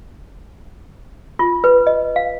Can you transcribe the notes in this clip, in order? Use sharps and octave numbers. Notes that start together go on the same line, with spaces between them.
F4
B4
D#5
F5